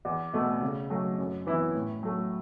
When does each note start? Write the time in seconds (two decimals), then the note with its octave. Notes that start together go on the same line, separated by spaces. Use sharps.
0.05 E2
0.33 B2 A3
0.61 C#3
0.90 F#3 A3
1.18 F#2
1.46 E3 B3 E4
1.75 A2
2.03 F#3 A3